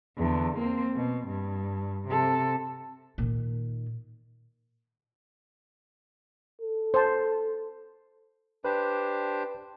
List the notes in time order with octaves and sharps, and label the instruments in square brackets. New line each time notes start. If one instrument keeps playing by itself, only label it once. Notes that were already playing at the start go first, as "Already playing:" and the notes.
[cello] E2 D3
A#3 C4
B2
G2
C3 A4
[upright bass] A#2 D#3
[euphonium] A4
[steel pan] C5 A5
[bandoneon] D4 G4 C5 [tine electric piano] B4